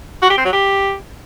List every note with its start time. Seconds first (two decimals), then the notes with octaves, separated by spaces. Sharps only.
0.22 F#4
0.30 G4
0.37 C4
0.45 F#3
0.52 G4